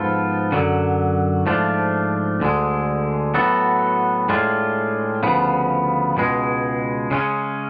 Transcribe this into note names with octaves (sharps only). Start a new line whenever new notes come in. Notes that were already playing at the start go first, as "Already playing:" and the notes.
Already playing: G#2 F3 B3 F4 A4
F#2 D3 F#3
G#2 F3 A3 D4 F4
D2 D3 G#3
A2 F#3 B3 F#4 A4
A2 G#3 D4 F4
D2 C#3 F3 B3
C#2 B2 G#3
C#3 G#3 C#4